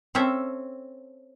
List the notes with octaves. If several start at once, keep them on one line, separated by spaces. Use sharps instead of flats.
C4 C#4 A4 E5